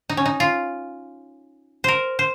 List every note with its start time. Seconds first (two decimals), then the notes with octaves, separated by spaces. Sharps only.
0.09 D#4
0.17 C#4
0.26 D#4
0.40 F4
1.84 A#4 C5
2.19 C5